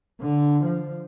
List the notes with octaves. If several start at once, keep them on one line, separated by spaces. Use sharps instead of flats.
D3
F3